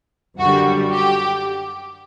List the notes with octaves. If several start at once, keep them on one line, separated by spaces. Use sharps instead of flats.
F#2 D3 G3 F#4
G4